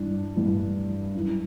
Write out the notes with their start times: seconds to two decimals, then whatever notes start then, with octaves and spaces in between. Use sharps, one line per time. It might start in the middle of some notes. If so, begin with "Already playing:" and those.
Already playing: G2 E3 D4
0.36 G2 E3
1.14 F#2 E3